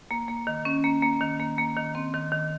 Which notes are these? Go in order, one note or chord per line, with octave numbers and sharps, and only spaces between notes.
A#3
A#3
D#3
C#4
A#3
A#3
D#3
A#3
A#3
D#3
C4
D#3
D#3